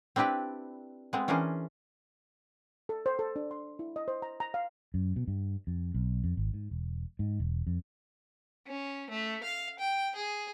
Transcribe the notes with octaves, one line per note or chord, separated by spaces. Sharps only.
C4 D4 E4 G4 B4
G#3 B3 C4
E3 C#4 D4 G#4 A#4 C5
A4
C5
A4
D4
C6
E4
D#5
C5
A#5
A#5
F5
F#2
B2
G2
F2
B1
F2
G#1
G#2
E1
G#2
E1
F2
C#4
A3
F5
G5
G#4